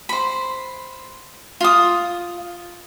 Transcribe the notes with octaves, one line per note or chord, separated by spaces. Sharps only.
C5 B5
F4 D#6